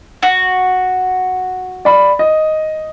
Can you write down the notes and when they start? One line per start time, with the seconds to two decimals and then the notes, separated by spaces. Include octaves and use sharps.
0.23 F#4
1.85 D5 B5
2.19 D#5